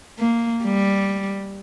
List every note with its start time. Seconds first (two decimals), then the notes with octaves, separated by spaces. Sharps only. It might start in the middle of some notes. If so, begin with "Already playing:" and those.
0.19 A#3
0.64 G3